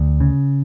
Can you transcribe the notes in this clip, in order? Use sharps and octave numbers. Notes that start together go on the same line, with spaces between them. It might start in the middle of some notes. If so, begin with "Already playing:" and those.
Already playing: D2
C#3